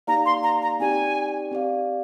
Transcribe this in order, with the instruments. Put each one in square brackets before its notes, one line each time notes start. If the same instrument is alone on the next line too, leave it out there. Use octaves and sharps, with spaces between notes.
[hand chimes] A#3 D#4 G4 D5 F5 [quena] A#5
[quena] C6
A#5
A#5
[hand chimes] C4 D#4 G4 D5 G5 [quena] G#5
[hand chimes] C4 G4 D5 F5